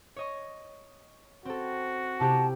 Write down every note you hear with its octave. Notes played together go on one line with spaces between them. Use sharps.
C#5 D#5 C#6
C4 F#4 A4
C3 E4 G4 A5